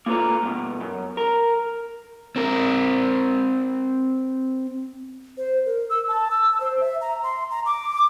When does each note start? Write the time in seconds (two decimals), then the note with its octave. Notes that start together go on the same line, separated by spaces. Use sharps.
0.06 A#3 F4 A4 B4 A#5
0.43 G2 B2
0.81 F#2
1.17 A#4
2.36 C4 A#4
5.37 C5
5.66 A#4
5.90 E6
6.08 A5
6.31 E6
6.60 C5
6.81 E5
7.01 A#5
7.23 C6
7.50 A#5
7.66 D6